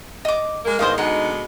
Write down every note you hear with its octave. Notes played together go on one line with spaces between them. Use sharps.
D#5 D6
G#3 A#3
E2 G#2 D#3 C5 D#5 F5
B2 D3 G#3 D#4 F#5